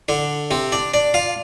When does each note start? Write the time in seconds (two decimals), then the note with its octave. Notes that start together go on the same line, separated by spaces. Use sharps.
0.09 D3 D4
0.51 C3 C4
0.72 D4 D5
0.94 D4 D5
1.14 F4 F5